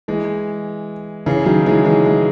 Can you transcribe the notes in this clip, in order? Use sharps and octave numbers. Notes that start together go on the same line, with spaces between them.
E3 G#3
C#3 E3
D#3 F#3
E3 G#3
E3 G#3
E3 G#3